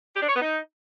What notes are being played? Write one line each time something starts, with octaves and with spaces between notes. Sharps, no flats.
G4
D4
C#5
B3
D#4